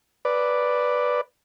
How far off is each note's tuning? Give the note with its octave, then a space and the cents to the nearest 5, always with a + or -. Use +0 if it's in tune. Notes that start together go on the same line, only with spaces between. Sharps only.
B4 +0 D5 +0